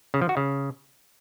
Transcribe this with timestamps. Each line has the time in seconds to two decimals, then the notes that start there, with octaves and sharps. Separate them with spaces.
0.14 C#3
0.22 F3
0.29 F#4
0.37 C#3